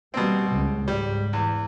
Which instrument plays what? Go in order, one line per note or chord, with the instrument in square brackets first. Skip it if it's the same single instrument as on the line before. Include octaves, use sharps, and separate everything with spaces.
[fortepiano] B2 C4 [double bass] G3 A#3
[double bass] C#2 C#3
[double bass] G#2 [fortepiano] G3
[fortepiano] E2